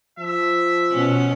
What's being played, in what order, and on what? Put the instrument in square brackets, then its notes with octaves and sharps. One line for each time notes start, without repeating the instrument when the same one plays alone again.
[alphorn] F3 [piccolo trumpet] E5
[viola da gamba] B2 C#4